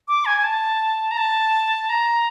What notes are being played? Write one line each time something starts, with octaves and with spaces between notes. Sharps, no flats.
D6
G#5
G#5
A5
A#5
A5
A#5